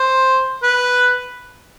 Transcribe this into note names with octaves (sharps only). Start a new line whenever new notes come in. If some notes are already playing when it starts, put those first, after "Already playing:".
Already playing: C5
B4